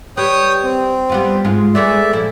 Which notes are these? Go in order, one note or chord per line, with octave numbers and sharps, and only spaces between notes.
G3 B4 C#5 G5 D#6
C4
G3 B3 F4
G#2 G#3 F4
G#3 A3 B3 D5 E5
A#2 F3 E4